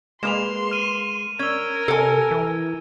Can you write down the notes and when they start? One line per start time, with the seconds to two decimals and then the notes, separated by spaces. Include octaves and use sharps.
0.23 G#3 A#3 B4 C6 E7 F7
0.71 F6 D#7
1.39 C#4 A#4 E6 G#6
1.88 C3 A4 G#5
2.31 E3